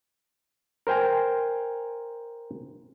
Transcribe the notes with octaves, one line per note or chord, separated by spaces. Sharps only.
A#4 C5 G5 G#5 A#5